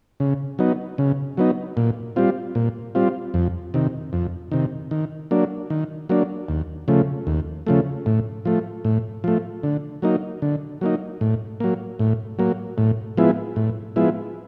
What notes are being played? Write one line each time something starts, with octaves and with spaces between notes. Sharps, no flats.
C#3
F#3 B3 D#4
C#3
F#3 B3 D#4
A#2
G3 C4 F4
A#2
G3 C4 F4
F2
C3 D#3
F2
C3 D#3
D#3
F#3 A#3 D4
D#3
F#3 A#3 D4
D#2
C#3 F3 A3
D#2
C#3 F3 A3
A2
F3 A3
A2
F3 A3
D3
F#3 A#3 D#4
D3
F#3 A#3 D#4
A2
F#3 A#3
A2
F#3 A#3
A2
F3 G#3 B3 E4
A2
F3 G#3 B3 E4